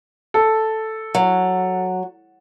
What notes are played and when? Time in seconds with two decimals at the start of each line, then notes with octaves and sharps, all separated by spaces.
0.34 A4
1.15 F#3